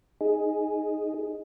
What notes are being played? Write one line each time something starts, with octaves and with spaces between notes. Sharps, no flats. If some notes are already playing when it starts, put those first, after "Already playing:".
D#4 G#4